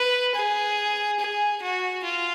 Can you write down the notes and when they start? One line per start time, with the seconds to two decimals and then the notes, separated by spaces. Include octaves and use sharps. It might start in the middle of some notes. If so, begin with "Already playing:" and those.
Already playing: B4
0.35 G#4
1.20 G#4
1.62 F#4
2.04 F4